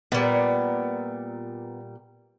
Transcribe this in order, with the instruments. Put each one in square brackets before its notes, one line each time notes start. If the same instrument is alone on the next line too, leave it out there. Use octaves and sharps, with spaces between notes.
[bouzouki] A#2 G3 [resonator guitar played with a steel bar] B3